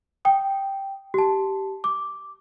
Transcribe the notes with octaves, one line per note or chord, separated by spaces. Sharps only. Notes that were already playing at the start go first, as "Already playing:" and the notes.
G5 D#6
G4 A5
D6